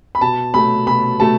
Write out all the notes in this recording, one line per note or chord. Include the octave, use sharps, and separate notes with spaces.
B5
B2 A5
F#3 A3 B5
B2 B5
F#3 A3 A5